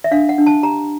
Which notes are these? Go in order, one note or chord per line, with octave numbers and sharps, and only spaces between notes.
E5
D4 F5
F#5
D4
A5
G4 A#5